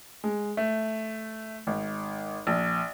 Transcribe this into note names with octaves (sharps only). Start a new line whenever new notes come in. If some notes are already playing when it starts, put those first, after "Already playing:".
G#3
A3
G#1
A#1